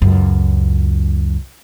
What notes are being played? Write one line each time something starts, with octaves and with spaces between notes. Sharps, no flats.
C#2 F#2